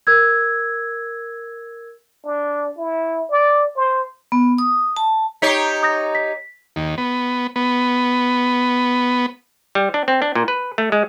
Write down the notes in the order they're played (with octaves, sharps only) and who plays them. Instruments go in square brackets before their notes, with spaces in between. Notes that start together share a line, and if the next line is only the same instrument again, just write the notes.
[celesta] A#4 E6 G#6
[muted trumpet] D4
E4
D5
C5
[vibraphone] B3
D#6
A5
[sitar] D#4 G4 C#5 [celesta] B6 C7
[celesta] D#6 G6 A#6
B6
[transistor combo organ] D#2
B3
B3
[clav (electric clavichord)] G3
D4
C4
D4
A#2
B4
A3
G#3